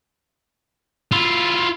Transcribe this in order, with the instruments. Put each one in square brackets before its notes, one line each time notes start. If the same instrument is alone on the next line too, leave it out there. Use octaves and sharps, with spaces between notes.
[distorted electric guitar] E4 F4